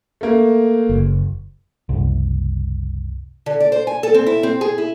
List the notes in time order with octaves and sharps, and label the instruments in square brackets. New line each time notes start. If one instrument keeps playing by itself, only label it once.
[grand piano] A3 A#3
[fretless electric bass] F#1
[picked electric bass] F#1 C2
[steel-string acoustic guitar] D3
D5
C5
G#5
A4
C4
E4
C4
G#4
E4